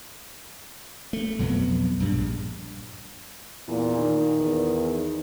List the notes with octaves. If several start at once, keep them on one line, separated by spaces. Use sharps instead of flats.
A3
B1 F2 F#3 B3
A#1 G2
E2 A#2
D#3
E2